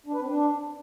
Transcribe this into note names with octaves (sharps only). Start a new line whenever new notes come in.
D4
B4
C4
D4